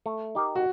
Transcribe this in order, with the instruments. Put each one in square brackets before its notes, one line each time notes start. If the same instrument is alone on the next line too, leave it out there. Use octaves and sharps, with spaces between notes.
[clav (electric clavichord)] A3
D#4 G4 A#4
[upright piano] F#4